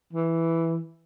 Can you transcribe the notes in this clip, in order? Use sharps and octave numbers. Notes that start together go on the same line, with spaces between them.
E3